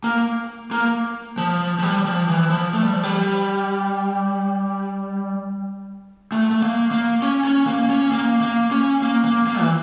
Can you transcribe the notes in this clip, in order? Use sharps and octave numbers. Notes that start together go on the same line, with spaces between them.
A#3
A#3
F3
F3
G3
F3
E3
F3
A3
G3
F3
G3
A3
A3
A#3
A#3
C#4
C#4
A#3
C#4
A#3
A#3
C#4
A#3
A#3
A#3
E3